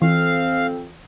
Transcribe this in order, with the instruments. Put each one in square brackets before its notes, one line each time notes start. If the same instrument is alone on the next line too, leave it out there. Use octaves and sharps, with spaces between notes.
[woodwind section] F2 C4 [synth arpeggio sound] E3 [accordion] F5